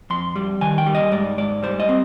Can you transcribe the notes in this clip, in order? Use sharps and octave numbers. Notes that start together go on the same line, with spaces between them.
F2 C6
G3
D#3 G#5
G5
G3
D#5
G#2 D5
G#2 D5
G3 C5
D#5
C4